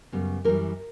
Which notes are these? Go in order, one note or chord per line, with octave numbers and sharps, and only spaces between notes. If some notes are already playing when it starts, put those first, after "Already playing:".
F#2 C#3 G3 B3
F#2 E3 G3 A#3 A#4